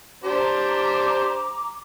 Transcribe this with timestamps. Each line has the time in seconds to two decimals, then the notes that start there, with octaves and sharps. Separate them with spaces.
0.24 D4 G4 C5 A#5 D6